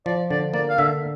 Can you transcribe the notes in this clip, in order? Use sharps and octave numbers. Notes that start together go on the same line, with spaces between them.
F3 D5
D3 D5
A#3 D5
F5
D3 E5